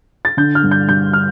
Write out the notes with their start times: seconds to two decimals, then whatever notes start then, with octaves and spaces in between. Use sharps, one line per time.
0.25 A6
0.37 D3 G6
0.55 F6
0.63 G2
0.71 G6
0.88 G2 G6
1.13 F6